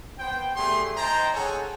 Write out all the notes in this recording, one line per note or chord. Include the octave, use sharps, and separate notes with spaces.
B3 C5 G5
A3 D4 G4 G#4 C6
D#4 C5 G5 A5 A#5
G#4 A4 C#5 F#5 G#5